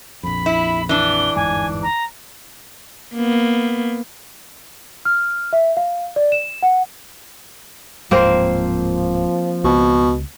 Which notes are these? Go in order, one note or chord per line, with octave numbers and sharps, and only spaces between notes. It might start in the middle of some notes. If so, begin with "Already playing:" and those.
A#1 F2 B5
E4
E3 D4 G7
G1 E2 G#2 G#5
A#5
A#3 B3
F6
E5
F5
D5
E7
F#5
D1 G#2 F3 A#3 C4 C5
C#2 B2